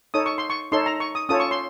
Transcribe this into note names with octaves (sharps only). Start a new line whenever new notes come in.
D#4 A4 C#5 D#6
C#6
C6
C#6
D#4 A4 C#5 C6
A#5
C#6
D#6
C#4 F4 A4 C#5 D#6
C#6
C6